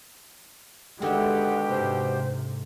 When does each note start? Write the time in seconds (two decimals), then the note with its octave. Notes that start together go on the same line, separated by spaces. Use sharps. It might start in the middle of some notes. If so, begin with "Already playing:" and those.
1.02 B2 D3 D#3 G#3 E4 G4 F#5
1.69 G#2 C3 C5